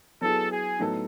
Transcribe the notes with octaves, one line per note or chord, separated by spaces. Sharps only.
F#3 B3 E4 G#4 A4
G#4
A2 F#3 B3 D#4 A4